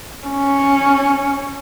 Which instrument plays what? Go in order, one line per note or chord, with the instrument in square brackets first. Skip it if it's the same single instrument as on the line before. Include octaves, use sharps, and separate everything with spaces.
[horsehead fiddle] C#4